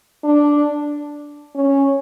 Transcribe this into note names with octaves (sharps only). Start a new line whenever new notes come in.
D4
C#4